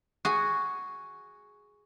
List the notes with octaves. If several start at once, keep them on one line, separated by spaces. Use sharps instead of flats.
F#4 G#4